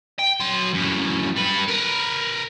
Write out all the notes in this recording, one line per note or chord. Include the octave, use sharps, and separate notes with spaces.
G5
F#3 C6
F#2 A2
G3 B4
A#4 B4